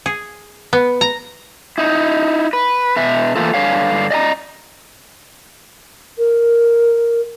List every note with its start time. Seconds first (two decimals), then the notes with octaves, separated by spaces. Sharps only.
0.06 G#4
0.73 B3
1.01 A#5
1.78 D#4 E4
2.53 B4
2.96 B2 B4 E5
3.35 E3 A3 A#3 F4 A4
3.54 G2 D3 C#5 F5
4.10 D5 D#5 G5 A#5
6.18 A#4